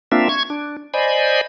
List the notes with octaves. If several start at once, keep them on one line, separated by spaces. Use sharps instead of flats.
A#3 C4 D4 F4 E5
C#6 G#6
D4
C5 D5 D#5 G#5 B5